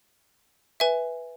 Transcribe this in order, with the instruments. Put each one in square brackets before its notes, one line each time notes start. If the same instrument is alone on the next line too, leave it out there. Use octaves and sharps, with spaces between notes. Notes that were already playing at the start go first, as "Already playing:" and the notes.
[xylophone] B4 E5 G#5